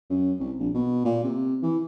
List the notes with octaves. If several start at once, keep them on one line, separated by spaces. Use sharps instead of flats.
F#2
C2
A#1
B2
A#2
C3
E3